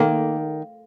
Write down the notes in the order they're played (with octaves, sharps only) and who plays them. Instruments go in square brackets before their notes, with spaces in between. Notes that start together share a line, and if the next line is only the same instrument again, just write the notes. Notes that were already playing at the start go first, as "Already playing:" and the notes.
Already playing: [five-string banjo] D#3 [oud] A#3